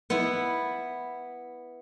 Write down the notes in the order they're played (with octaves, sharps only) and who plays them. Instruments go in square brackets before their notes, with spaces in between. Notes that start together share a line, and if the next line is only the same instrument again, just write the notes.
[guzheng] B3 E4